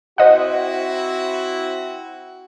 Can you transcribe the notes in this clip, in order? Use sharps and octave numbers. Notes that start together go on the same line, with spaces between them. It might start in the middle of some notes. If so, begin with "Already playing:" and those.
C4 E4 F#4 C5 D#5 F#5